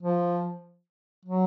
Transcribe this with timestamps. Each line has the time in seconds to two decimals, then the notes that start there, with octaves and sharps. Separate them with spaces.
0.03 F3
1.25 F#3